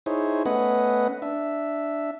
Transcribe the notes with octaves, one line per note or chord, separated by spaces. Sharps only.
D#4 E4 G#4 C5 C#5
A3 B3 C#4 B4 D#5 F#5
D4 E5